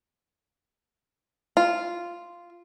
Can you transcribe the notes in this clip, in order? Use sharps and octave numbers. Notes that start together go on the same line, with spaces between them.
F4